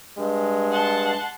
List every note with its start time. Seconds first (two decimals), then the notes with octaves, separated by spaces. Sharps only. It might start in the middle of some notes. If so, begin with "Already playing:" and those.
0.18 G2 G#3
0.70 F#5 A5 C6